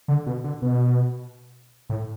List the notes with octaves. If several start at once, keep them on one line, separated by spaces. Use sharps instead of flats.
D3
B2
D3
B2
A2